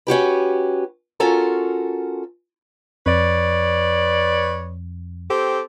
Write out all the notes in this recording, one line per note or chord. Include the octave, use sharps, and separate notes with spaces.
C#4 F#4 G4 B4
C#4 F4 F#4 A4 A#4
F2 B4 C#5 D5
C4 G4 A4